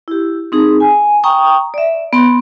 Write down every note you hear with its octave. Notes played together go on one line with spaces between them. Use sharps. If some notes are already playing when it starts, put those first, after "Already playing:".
E4 G4
C4 D#4 G#4
G#5
G5 A#5 C#6 D#6
D5 E5
B3 C6